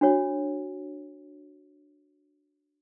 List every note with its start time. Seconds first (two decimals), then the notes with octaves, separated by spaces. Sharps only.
0.01 D4 F#4 C#5